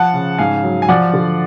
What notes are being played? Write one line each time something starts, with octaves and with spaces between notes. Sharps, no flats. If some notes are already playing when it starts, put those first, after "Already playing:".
Already playing: F3 F#5 A5
C#3
G#2 F5 G#5
F#3
G#5
F3 D5 F#5
D3